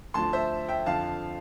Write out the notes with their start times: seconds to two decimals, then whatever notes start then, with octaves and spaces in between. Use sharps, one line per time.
0.14 D2 D3 F3 A5 C6
0.33 C5 E5
0.68 E5 G5
0.86 F2 D3 F3 F5 A5